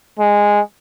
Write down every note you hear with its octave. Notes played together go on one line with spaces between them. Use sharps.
G#3